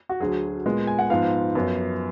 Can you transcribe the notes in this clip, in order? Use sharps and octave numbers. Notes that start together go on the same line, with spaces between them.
F#4
D2 D3 F#3 G#4
A#2 G#3 B3
G#5
F#5
G#2 F3 B3 F5
F#2 F3 B3